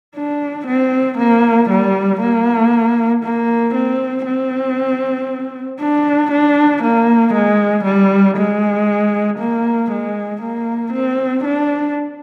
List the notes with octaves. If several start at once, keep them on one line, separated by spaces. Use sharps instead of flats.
D4
C4
A#3
G3
A#3
A#3
C4
C4
D4
D4
A#3
G#3
G3
G#3
A#3
G#3
A#3
C4
D4